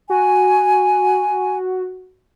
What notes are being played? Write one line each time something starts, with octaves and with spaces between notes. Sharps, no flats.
F#4 G#5